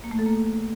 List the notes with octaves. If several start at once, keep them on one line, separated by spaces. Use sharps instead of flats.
A#3
A3
A4
A#3